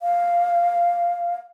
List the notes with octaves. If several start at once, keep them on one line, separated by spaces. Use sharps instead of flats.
F5